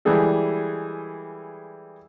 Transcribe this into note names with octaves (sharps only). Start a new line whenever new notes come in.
E3 G3 G#3 G#4 A4